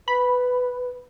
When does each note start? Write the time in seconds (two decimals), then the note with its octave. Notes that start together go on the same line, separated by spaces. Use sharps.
0.08 B4 B5